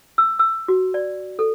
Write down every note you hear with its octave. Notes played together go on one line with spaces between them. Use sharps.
E6
E6
F#4
D5
A4